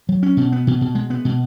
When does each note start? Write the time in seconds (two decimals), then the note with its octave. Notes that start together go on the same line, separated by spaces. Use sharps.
0.09 F#3
0.23 C#4
0.37 B2
0.52 B3
0.67 B2
0.81 B2
0.95 G#3
1.10 B3
1.25 B2